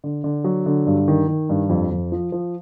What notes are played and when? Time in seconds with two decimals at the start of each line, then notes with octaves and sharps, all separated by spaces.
0.04 D3
0.24 D3
0.44 F#3
0.66 D3
0.87 G2
1.08 D#3
1.28 D#3
1.49 G2
1.69 F2
1.91 F2
2.12 F3
2.32 F3